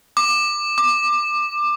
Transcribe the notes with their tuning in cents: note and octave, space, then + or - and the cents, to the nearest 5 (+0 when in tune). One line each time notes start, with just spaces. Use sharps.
D6 +25
D6 +20